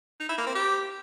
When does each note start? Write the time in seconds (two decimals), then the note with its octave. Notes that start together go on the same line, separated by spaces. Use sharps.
0.20 D#4
0.29 E4
0.38 A#3
0.46 C4
0.55 G4